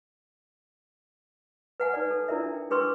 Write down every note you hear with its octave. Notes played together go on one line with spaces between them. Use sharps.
B4 F#5 G#5
D#4 B4 D5
A4
D4 E4 F4 A#4 D5 E5
G5
D4 G#4 B4 C6 C#6 E6